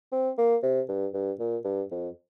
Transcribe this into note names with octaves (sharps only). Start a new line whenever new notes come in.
C4
A#3
C3
G2
G2
A#2
G2
F2